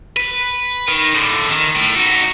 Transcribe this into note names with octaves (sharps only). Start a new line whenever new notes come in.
B4
D#3
A2 D3
D#3
A2
D#4 F#4